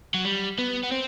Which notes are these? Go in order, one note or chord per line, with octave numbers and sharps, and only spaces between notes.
F#3
G3
B3
B3
C4